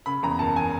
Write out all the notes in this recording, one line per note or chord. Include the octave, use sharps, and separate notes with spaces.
C#3 B5
E2 A#5
F#1 A5
G#5